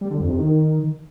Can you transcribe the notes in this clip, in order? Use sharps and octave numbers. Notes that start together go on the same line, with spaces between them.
G3
D3
F2
C3
D#3